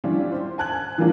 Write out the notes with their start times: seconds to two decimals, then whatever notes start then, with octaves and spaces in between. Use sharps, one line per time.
0.04 F3 G3 C#4 D4 E4 F4
0.32 C5
0.58 G#5 A5 F#6 G#6 F#7
0.98 E3 F3 G3 A#3 D4 F#4